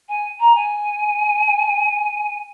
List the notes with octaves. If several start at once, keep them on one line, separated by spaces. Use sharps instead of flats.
G#5
A#5
G#5